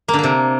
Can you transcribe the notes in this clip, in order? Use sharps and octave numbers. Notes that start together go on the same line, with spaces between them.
A#3
D3
A#3
C3